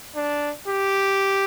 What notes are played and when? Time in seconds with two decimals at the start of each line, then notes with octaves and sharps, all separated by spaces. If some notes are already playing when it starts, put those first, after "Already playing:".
0.15 D4
0.68 G4